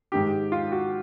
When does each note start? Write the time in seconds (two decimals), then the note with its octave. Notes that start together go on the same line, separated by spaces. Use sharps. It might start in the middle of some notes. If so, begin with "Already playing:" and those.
0.12 G#2 D#3 G4
0.52 F4
0.72 F#4